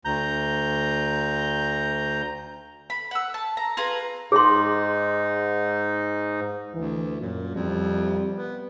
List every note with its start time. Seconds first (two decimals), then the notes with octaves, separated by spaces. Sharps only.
0.05 D2 A#5 G6
2.90 B5
3.11 F#5 E6
3.34 A5
3.57 A#5
3.77 F4 G#4 B4 A#5
4.32 G#2 D#4 G#4 C6
6.73 D2 E3
7.21 F#2 A#2
7.55 F2 G3
8.33 B3